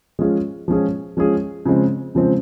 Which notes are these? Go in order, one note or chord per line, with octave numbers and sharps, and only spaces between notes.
F3 G#3 C#4 F4 G#4
F3 G#3 C#4 F4 G#4
F3 G#3 C#4 F4 G#4
C#3 F3 G#3 C4
C#3 F3 G#3 C4